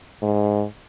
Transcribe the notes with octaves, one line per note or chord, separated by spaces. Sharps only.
G#2